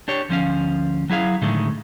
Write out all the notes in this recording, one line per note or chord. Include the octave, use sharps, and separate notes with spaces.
D4 G4 C#5
D2 F3 C#4 F5
F#3 E4 G#4 F5
A2 D3 D#3 G#3 A3